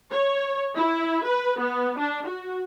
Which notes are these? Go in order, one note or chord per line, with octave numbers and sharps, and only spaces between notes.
C#5
E4
B4
B3
D4
F#4